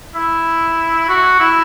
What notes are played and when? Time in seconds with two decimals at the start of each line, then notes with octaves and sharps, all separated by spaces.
0.15 E4
1.09 F#4
1.40 E4